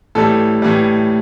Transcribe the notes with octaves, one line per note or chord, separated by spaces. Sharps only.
A2 E3 G3 A4
A2 E3 G3